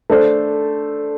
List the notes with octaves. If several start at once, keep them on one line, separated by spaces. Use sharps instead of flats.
A3 D4 A4 C5